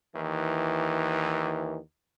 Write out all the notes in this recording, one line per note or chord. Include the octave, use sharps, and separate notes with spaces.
D#2 E3